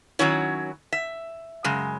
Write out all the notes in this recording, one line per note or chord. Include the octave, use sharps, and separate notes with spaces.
D#3 F#3 C#4 E4 C#5
E5
F#2 C#3 G#3